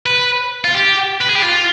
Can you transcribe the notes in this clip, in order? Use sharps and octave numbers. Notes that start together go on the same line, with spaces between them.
B4
F4
G4
B4
G#4
G4
F4